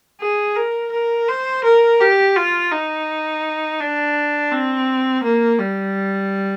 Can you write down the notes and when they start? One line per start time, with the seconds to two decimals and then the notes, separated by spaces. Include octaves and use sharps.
0.21 G#4
0.57 A#4
0.92 A#4
1.28 C5
1.64 A#4
2.01 G4
2.36 F4
2.72 D#4
3.80 D4
4.52 C4
5.24 A#3
5.59 G3